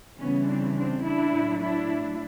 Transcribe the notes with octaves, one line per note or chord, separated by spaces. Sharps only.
C#3 E3 G3 B3 C#4
C4 D4
C4 D4
D4 E4
A2 F#3
D4 E4